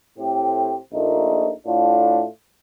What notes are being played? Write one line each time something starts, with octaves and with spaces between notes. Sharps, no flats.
A2 A3 C4 G4
A#1 A#2 A3 D#4
A2 A3 D4 F4